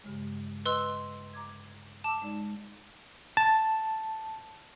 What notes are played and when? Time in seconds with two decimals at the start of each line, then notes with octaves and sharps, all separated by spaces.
0.04 G2 C#3 G#3
0.66 B4 D#5 C6 E6
1.33 A#5 D6 G#6
2.04 A5 D6 E6
2.22 G#3 D#4 D5
3.37 A5